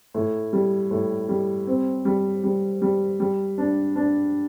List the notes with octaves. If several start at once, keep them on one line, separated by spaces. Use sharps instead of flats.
A2
G3
A2
G3
C4
G3
G3
G3
G3
D4
D4